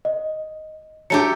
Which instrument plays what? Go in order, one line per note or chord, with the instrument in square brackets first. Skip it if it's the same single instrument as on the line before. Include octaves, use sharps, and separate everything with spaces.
[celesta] D#5
[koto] F#3 A3 G4 [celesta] D4 C#7